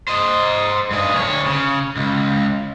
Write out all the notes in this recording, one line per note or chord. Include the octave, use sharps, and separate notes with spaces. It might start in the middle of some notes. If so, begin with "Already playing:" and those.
C5 D#5
G2 G#4
D2 C#5
C#3
C#2